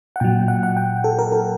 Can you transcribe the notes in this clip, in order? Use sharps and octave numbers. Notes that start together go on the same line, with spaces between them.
F#5
A#2 F#3 G5
F#5
F#5
G5
A4
A#4
A4